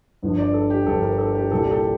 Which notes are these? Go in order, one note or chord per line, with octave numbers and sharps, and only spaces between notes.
G1 G2 D3 F3
D5
A4
G4
G1 G2 D3 F3 A4
A#4
A4
G4
C2 A#2 G3 A#3 A4
G4
A4